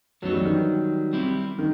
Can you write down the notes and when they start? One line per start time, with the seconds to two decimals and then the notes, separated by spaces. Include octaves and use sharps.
0.22 F#2 E3 F#3 B3 D#4 F#4
0.33 G3
0.45 D#3
1.13 G3 C4 E4 G4
1.58 D#3